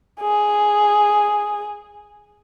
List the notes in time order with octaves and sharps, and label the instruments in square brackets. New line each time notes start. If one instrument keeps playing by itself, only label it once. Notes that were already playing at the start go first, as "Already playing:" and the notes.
[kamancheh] G#4